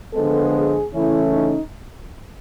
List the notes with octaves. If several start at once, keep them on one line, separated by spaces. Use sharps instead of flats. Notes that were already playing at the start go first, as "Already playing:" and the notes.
D3 F3 G#3 B3 A4
G#4
C#3 E3 A3 C#4 E4
D#4